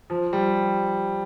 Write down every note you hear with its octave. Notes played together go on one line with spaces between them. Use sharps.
F3
G3